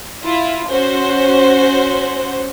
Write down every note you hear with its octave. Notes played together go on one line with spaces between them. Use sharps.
E4 F4
C#4 F#4 C5